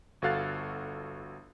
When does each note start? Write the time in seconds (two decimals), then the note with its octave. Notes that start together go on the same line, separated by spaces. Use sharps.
0.22 G1 F#4 A4 F5 F#6 A6